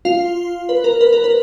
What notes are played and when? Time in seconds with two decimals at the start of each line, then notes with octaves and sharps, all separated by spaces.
0.05 F4 F5
0.69 B4
0.84 A#4
1.01 B4
1.13 A#4
1.24 B4